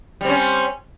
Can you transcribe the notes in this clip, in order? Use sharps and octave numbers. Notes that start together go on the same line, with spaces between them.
G3 C4 C#4